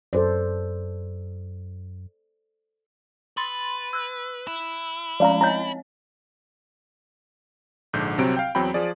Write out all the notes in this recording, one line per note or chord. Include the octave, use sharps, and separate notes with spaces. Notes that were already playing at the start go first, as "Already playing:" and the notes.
F#2 A4 C5 D5
B4 B5 C6 A6
E6 F#6
E4
F3 G#3 C#4 D5 F5 A#5
C4 C#5 D#5 A#5 G6
A#1 G#2 D3 G6
C2 C3 F#3 C4 D7
F5 G5
E2 F#3 C4 G5 B5
F3 G#4 D5